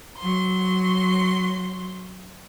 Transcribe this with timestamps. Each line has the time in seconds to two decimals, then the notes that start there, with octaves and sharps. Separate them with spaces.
0.18 F#3 C6